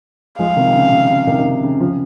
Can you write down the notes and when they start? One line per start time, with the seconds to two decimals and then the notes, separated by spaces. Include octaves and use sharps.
0.38 F3 G#3 F5
0.56 C3 D#3
0.75 C#3
0.92 C3
1.10 C#3
1.27 C3 D#3
1.39 D#3
1.45 C#3
1.63 C#3
1.80 C#3 F3